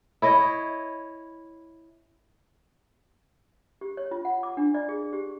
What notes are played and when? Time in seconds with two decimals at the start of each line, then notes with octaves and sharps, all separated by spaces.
0.22 E4 C#5 D#5
3.81 G4
3.97 C#5
4.11 F4
4.25 F#5
4.43 D6
4.57 D4
4.74 D5
4.89 G#4
5.13 G4